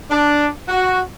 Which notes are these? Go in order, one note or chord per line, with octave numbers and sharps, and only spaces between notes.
D4
F#4